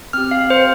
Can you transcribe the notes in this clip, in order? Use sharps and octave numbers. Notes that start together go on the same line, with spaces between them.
C4 G4 F6
F5
C5